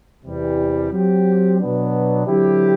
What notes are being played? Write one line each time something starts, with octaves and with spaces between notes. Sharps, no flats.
E2 C3 E3 G3
F#3 C4 G4
B2 F#3 B3 D4
D3 F#3 C4 E4 G4